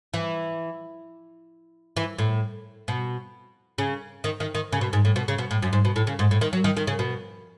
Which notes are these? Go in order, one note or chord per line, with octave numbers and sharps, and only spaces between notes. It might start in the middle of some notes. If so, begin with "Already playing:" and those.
E3
E3
A2
B2
C#3
D#3
D#3
D#3
C#3
B2
G#2
A2
B2
C#3
B2
A2
F#2
G#2
B2
A2
C#3
G#2
A2
D#3
F#3
D#3
D#3
C#3
B2